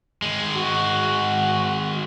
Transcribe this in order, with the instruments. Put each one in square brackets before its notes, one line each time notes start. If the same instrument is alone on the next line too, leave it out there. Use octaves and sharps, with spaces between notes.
[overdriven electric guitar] D#3 G#3
[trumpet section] F#4